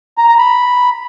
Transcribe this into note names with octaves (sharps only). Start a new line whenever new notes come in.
A#5
A#5
B5